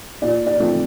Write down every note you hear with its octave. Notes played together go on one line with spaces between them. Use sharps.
A#2 D5
D5
F3 A3 C4